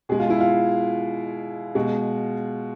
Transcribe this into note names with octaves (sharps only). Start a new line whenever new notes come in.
B2 G#3 G#4
F4
E4
F4
B2 G#3